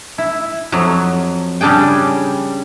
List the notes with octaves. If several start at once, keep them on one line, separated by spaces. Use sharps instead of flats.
E4
F2 F#3
C#3 G3 D4 G#4 G5